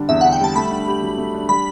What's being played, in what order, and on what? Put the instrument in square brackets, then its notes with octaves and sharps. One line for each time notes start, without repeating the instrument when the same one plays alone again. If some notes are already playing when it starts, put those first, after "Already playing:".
Already playing: [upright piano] D3 G3 D4
[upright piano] E2 [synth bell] E5
[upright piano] D3 [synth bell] F#5
[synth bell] G5
[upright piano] G3 [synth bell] A5
[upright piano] A3 [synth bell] B5
[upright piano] D4
G4
F#3
A3
D4
[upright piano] G3 [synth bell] B5